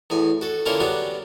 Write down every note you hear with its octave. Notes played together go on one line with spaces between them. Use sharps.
E2 A2 G#5
F#4 A4
D3 A#3 C#4 E4 F4 A#4
F#3 G3 B3 D4 F#4